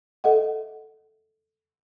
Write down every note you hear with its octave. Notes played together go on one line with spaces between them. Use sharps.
A4 D#5 E5 F#5